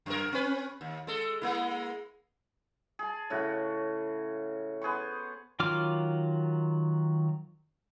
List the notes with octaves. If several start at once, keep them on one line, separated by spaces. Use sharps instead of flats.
F#2 A#4
C4 C#4 B4
D#2
G#3 A4
G#3 A#3 E4
G#4 A5
A2 C#3 F#4
B3 G#4 C5 C#6
D#3 F#3 F4 D6 F6